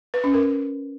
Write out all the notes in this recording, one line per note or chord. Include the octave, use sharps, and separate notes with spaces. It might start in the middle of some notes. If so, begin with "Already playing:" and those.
B4
C#4
A#4